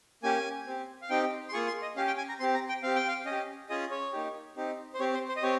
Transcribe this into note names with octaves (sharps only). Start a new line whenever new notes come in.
A#3 C#4 G4 G#5
C4 G4
F5
C4 D#4 G4 G5
C6
A#3 F4 G#4 C#6
C6
D#5
C#4 G4 F5
G5
G#5
A#5
C4 G4 C6
A#5
G5
C4 G4 F5
G5
F5
C#4 D#5
G4
C#4 F4 G#4 D#5
C#5
A#3 D#4 G4
C4 D#4 G4
C5
C4 G4 C#5
C5
C5
D#5
C4 G4 C#5